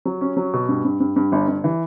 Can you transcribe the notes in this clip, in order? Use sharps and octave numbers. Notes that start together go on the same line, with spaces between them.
F#3
C#4
F#3
B2
G2
G2
G2
G2
G1
G1
E3